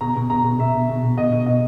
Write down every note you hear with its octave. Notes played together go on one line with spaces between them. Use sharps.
B2 A#5
B2
B2 A#5
B2
B2 E5
B2
B2
B2
B2 D#5
B2
B2 D#5